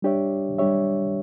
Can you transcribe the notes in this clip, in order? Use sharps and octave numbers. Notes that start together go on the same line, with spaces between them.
G3 D4 G4 C#5 E5
G3 D4 G4 C#5 E5